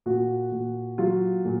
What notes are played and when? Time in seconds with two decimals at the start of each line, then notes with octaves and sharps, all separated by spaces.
0.06 A#2 F#4
0.52 A#2
0.98 F#3 F4
1.45 A#2